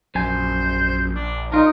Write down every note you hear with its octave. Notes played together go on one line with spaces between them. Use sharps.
A#1 F#2 C5 G#5
D4
D4 D#4 F4 A#4